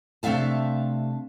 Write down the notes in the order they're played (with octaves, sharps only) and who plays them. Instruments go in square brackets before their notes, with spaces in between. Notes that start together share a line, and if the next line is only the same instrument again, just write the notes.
[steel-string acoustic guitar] C3 A3 D4 E5 F5 A5